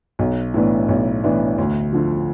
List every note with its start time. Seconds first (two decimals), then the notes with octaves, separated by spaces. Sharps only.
0.19 B1
0.54 A2 E3 B3 D4
0.89 B1
1.24 A2 E3 B3 D4
1.58 D2
1.93 D3 F3